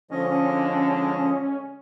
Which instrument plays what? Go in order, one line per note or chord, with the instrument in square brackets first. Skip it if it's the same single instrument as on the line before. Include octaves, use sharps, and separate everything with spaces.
[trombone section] D3 G#3 [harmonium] F3 D#5 [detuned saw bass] C#4